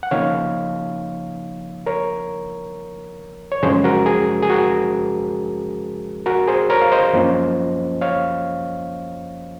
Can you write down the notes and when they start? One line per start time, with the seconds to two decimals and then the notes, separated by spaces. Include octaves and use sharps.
0.03 F#5
0.11 C#3 F3 A#3 D#4 C#5 F5
1.86 A#4 C#5
3.52 C#5
3.63 F#2 C#3 F3 G#3 C#4 G#4 C5
3.84 F#4 A#4
4.06 G#4
4.42 G#4
4.50 F#4 A#4
6.26 F#4 A#4
6.48 G#4 C5
6.70 A#4 C#5
6.81 F5
6.92 C5 D#5
7.13 F#2 F3 A#3 C#4 F4
8.01 C#5 F5